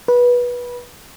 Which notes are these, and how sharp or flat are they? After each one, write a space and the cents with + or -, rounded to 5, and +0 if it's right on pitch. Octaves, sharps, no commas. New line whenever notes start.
B4 -20